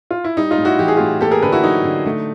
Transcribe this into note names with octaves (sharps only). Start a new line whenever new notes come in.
F4
E4
G3 D#4
D#4 F4
A2
E4 F#4
E3 G4
G#4
A2 F4 G4
A#3 G4 A4
G#4 A#4
D3 A4 B4
E4 F#4
F#3 D#4
D3
A3